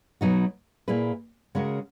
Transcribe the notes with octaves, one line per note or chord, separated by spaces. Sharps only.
B2 F#3 B3 D#4 F#4
A#2 A#3 E4 G#4 B4
C#3 G#3 C#4 F#4 A#4